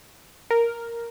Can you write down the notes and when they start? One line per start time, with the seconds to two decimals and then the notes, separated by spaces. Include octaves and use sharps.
0.51 A#4